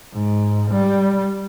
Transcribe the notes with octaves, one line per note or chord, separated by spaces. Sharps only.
G#2
G3